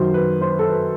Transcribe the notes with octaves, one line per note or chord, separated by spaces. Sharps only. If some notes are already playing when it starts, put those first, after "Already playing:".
Already playing: F#2 D#3 F#3 C5
B4
C5
B4
A4
B4